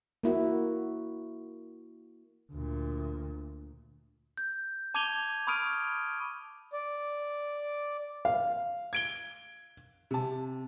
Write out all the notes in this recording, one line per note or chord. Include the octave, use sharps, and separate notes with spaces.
A#3 E4 F#4
D2 A#2
G6
A5 D6 G#6 D#7 F7 G7
B5 C#6 D#6 F6 D7 D#7
D5
F5
G#6 D7 G7
C3 A5